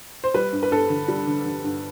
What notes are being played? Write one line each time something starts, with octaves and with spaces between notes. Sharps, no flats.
C5
G3 B4
G2
B4
G2 A4
D3
G3
D3
D3
G2